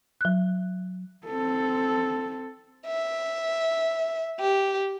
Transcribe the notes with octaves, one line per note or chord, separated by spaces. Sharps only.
F#3 F#6
C4 A4
E5
G4